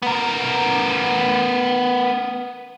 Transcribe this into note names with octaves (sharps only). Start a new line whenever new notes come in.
B3 A#4